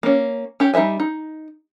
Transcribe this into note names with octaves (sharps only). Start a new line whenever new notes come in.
A#3 C#4
C#4 G4
G3 D#4 C5 E5 G#5
D#4